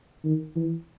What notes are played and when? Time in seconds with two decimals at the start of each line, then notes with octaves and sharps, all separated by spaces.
0.24 D#3
0.56 E3